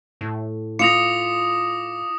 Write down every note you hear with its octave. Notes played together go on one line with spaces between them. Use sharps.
A2
F4 D6 D#6 A#6 C#7 F7